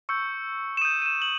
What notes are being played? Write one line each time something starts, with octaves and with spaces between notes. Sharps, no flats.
C#6 E6 G6 C#7
E7
D#6 G6 D#7
D#7
E7
F#7